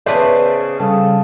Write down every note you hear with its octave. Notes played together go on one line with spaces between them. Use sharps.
C#3 B3 B4 C5 D5 E5 A5
C#3 G3 A4 F5 D#6